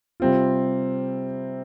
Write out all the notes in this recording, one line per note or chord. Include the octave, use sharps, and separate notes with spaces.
C3 G3 C4 F4